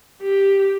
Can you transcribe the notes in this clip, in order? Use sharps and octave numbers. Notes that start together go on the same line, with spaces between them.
G4